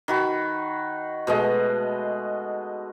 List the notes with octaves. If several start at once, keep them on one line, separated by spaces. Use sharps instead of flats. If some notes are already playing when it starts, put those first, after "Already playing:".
D#3 F#4 B5
B2 G#3 A3 D#5